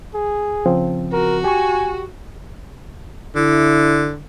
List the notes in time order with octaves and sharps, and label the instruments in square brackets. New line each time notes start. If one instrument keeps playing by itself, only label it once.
[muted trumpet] G#4
[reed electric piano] C#3 F3 C4
[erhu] F#4 [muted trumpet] A#4
[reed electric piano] G4 C#6 [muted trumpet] G#5
[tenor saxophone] D3 [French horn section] E4